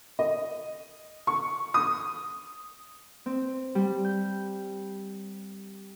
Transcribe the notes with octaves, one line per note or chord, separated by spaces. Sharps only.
D#5
C#6
D#6
C4
G3
G6